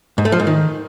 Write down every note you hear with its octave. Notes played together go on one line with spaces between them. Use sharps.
G#2
A3
F3
G#2
D#3